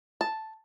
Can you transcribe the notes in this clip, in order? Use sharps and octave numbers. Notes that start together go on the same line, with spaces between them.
A5